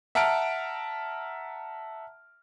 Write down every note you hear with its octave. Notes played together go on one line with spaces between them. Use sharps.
E5 F#5 A5 A#5 F6 D7